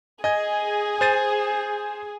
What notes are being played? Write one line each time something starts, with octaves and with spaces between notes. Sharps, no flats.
G#4 D#5 G#5 G#6
C5 A6 D#7